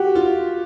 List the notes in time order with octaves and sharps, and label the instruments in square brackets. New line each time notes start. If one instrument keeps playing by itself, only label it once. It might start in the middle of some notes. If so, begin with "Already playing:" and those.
Already playing: [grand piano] F#4 G4
F4